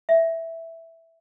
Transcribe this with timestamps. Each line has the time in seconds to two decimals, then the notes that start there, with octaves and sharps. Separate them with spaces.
0.09 E5